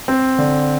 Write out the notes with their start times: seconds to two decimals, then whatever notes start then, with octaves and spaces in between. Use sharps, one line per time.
0.08 C4
0.39 D3